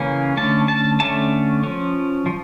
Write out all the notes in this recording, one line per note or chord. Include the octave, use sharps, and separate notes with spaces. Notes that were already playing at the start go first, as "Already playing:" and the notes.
Already playing: C#3 E3 A#3 C#4
D3 A3 C#4 A5
A5
D3 A3 C#4 A5
F3 C#4
F3